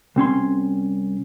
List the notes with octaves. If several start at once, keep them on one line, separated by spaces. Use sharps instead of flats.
C2 C4 C#4 C6